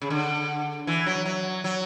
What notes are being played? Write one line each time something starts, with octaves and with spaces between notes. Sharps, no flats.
C#3
D3
E3
F#3
F#3
F#3